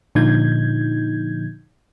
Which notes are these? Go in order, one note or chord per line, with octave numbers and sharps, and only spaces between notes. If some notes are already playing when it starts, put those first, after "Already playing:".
A#2 D3 F3 D#4 G6 G#6